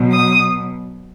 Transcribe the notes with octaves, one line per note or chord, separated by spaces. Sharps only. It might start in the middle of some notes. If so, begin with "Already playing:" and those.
Already playing: B2 F#3 B3
D#6